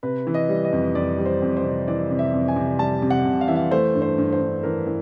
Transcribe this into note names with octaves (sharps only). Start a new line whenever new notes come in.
C3 B4
E3
D#5
G3
D#5
F2
F2 D5
G3
C5
F2
C5
C3
E3 D5
C3
E5
F2
G#5
C3
G3 A5
C3
F#5
C3
F5
E3 E5
F5
A3 C5
G2
C5
G2
C5
G2
E3 A#4
E3